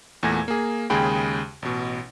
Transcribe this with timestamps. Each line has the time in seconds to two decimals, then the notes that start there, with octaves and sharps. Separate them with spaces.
0.23 E2 A#2 A3 G#5 G#6 A#6
0.48 A#3 G#4
0.90 D#2 C#3 G#3 G#4 G5 B5
1.62 A1 B2